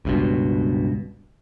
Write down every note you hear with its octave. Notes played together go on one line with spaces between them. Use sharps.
C#2 G2 B2